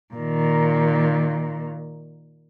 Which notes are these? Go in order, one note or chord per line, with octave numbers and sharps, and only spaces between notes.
A#2 D#3